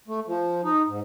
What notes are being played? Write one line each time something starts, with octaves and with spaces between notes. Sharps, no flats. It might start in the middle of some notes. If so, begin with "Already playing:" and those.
A3
F3
D#4
G#2